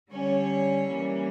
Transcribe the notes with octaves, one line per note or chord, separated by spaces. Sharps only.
D3 G3 C#4 C#5
E3 G3 A#3 C#4